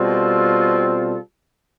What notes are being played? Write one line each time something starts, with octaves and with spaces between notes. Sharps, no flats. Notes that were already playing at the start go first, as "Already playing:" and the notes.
Already playing: B2 G3 C4 F4 A4